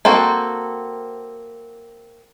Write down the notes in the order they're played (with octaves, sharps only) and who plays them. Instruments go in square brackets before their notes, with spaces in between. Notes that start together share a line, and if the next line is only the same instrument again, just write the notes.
[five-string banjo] A#3 C4 F#4 A4